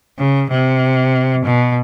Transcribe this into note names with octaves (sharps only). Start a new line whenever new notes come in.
C#3
C3
B2